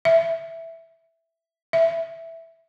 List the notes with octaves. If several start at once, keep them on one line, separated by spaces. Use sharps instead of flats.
E5
E5